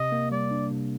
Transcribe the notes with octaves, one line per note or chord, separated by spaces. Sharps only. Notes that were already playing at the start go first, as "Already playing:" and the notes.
Already playing: C3 D#5
A#3
G3 D5
D4
C3